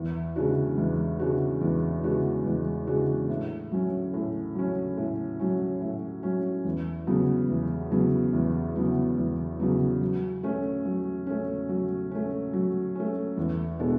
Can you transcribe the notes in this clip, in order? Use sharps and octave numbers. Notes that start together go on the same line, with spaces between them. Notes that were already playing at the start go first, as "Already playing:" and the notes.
Already playing: E2
C#3 G#3 D4 F#4
E2
C#3 G#3 D4 F#4
E2
C#3 G#3 D4 F#4
E2
C#3 G#3 D4 F#4
A2
F#3 C#4
A2
F#3 C#4
A2
F#3 C#4
A2
F#3 C#4
E2
C#3 F#3 B3
E2
C#3 F#3 B3
E2
C#3 F#3 B3
E2
C#3 F#3 B3
F#3
A3 C#4
F#3
A3 C#4
F#3
A3 C#4
F#3
A3 C#4
E2
B2 G#3 D4 A4